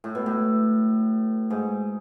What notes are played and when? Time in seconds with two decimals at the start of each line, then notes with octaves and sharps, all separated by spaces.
0.04 A2
0.15 B2
0.26 A2
1.50 G#2